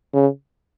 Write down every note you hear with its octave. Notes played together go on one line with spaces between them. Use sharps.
C#3